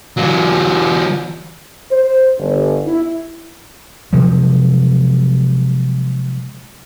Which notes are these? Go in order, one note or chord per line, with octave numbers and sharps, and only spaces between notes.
E3 F#3
C5
G1
E4
C3 F3 F#3 G#3